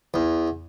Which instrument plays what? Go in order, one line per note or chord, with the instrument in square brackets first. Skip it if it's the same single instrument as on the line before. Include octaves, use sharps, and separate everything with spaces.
[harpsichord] E2